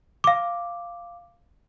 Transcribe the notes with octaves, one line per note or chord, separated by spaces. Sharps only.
F5 D6